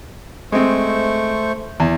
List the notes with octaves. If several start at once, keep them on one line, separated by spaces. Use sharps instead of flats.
G#3 A3 C4 C5 C#6
E2